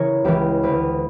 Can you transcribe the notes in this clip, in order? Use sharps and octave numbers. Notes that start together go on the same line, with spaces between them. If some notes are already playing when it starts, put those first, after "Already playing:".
Already playing: C#3 E3 E4 A#4 C#5
C#2 C#3 E3 G4 B4
D2 D3 G4 B4